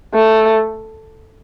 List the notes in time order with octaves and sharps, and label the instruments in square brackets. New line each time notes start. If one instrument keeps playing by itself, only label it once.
[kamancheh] A3